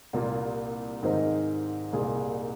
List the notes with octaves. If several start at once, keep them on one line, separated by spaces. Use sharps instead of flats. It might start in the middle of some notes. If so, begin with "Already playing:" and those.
C2 A#2 A#3 F4
G#2 D#3 C4 D#4 A#4
C2 A#2 A#3 G#4